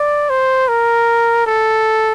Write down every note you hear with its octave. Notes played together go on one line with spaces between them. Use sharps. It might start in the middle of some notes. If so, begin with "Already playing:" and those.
Already playing: D5
C5
A#4
A4